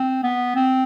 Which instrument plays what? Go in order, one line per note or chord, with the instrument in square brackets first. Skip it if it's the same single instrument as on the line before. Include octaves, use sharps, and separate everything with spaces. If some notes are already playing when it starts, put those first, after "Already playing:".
Already playing: [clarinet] C4
B3
C4